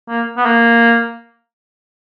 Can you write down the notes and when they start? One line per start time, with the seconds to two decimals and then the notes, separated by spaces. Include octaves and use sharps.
0.08 A#3
0.37 B3
0.46 A#3